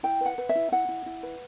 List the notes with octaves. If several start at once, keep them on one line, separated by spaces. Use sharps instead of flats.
E4 G5
B4 F#5
B4
E5
E4
E4 F#5
E4
E4
B4